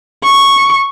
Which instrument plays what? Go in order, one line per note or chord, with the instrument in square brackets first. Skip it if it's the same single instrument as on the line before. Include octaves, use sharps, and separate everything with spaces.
[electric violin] C#6